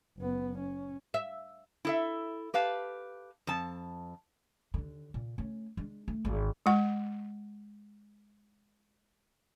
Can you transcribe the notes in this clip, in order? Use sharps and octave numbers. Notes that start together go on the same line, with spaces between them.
F#1 B3
C#4
E5
E4 A4 E5
G4 B4 F5 A5
F2 A5
D#2 D3
A#2
A3 C#4
G#3 D4
A3
G#1 D3
G#3 F#5